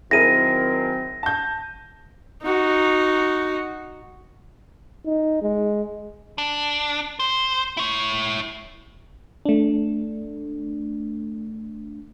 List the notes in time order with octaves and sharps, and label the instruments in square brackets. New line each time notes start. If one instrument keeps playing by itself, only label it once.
[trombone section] D#3 F#3 C4 [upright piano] E4 G#4 A#4 [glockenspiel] A#6 D#7
[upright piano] A5 G6
[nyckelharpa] D#4 F#4
[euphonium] D#4
G#3
[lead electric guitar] D4
C5
E4 C#5
[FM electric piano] A3 D4